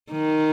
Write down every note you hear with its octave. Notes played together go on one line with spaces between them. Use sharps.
D#3